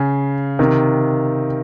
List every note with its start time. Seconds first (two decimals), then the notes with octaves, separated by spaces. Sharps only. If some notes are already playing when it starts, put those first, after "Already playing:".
Already playing: C#3
0.59 C3 D#3